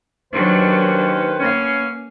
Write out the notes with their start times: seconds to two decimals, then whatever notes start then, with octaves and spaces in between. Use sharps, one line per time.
0.33 D#2 D#3 F#3 C#4 D4 B4 C5
1.39 A#3 B3 C#4 F5